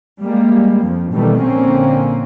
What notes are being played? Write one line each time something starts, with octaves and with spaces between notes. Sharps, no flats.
G3 G#3 A#3
F2 F3
B2 D#3 E3 G3 A3
A#1 D3 A#3 C4 C#4